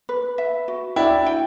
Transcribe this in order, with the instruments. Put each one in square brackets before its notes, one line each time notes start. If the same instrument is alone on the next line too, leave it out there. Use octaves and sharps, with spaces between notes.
[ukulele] B4
E5
F#4
[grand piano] D4 E4 [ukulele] G5
[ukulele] G5